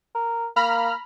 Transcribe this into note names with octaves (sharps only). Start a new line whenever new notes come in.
A#4
A#3 A#5 B5 F6